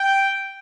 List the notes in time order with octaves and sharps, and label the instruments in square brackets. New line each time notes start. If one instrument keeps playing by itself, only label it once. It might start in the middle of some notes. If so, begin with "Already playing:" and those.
Already playing: [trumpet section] G5